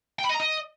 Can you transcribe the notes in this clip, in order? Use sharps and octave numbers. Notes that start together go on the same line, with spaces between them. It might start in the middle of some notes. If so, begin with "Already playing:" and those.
G5
B5
D#5
A#5
D#5